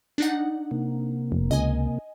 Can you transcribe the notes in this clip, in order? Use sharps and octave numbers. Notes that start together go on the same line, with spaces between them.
D4 D#4 F#5
C3 A#3
F1
C#2 D#5 G#5